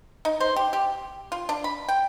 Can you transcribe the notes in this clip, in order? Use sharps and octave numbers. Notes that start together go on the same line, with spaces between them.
D#4
C5
G4
G4
F4
D4
B5
G5